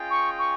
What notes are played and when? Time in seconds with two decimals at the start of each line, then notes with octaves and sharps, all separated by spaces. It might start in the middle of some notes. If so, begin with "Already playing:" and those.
Already playing: C#4 F4 G#4 D#5 G5
0.10 C#6
0.38 C#6